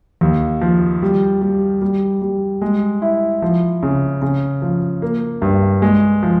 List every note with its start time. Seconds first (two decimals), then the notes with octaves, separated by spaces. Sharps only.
0.21 D#2
0.61 F3
1.02 G3
1.42 G3
1.82 G3
2.22 G3
2.62 G#3
3.02 E4
3.42 F3
3.83 C#3
4.22 C#3
4.62 F3
5.02 A#3
5.42 G2
5.82 G#3
6.23 F3